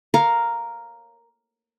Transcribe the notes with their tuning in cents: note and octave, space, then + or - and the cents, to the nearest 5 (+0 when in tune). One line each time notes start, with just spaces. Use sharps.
A#4 +0 C#5 -15 F5 +0